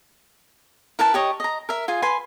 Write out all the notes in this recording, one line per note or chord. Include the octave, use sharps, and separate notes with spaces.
E4 A#4 B4 A5
G4 C#5 D#5
D#5 A#5
A#4 E5
F4 G#4 G#5
B4 G#5 C6